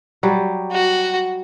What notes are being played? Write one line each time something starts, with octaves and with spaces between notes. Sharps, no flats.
F#3 G3
F#4